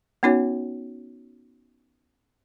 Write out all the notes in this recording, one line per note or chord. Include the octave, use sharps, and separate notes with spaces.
B3 C#4 D#4 F#4 C#5